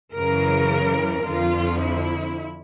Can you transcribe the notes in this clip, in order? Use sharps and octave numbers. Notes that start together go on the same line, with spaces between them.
F#2 C#3 E3 A#4
F2 D3 F3 F4
E4